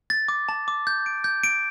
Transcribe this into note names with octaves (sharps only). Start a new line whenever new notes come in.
A6
D6
A5
D6
G6
D7
G6
D7